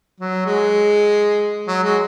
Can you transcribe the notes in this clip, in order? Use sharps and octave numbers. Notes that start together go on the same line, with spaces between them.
F#3
G#3
F#3
G#3